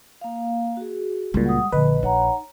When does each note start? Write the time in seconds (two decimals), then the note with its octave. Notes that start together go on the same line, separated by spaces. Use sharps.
0.21 A#3 F5
0.77 F#4 G#4
1.34 C#2 A#2 G3 G#3
1.45 F#5 D#6
1.72 A#1 D3 B4 D#5
2.03 D#4 C#5 F#5 A#5